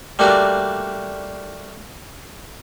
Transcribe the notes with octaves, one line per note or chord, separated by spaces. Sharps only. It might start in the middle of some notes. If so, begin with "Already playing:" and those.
G3 A3 A#3 D4 F#4